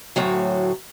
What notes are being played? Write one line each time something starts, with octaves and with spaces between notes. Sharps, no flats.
D2 A2 F#3